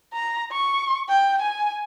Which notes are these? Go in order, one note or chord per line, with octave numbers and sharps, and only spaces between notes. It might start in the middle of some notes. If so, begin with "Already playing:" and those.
A#5
C#6
G5
G#5